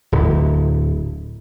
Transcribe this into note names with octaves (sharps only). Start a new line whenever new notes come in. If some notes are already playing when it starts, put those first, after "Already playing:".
D1